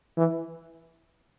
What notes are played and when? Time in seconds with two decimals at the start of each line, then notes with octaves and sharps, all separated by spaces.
0.17 E3